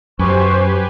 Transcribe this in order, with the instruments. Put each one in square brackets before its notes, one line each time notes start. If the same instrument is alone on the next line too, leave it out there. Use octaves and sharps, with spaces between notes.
[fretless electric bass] F#2 [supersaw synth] G4 B4 G#5 [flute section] C5 C#6